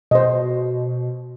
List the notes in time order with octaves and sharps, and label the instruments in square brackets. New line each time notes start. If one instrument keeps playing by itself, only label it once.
[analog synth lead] B2 [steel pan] C5 D#5